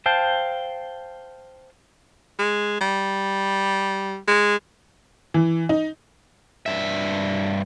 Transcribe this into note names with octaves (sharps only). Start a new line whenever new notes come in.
C5 F5 G5 A5
G#3
G3
G#3
E3
D#4
G2 E5